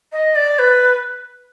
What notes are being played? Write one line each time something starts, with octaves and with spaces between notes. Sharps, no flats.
D#5
D5
B4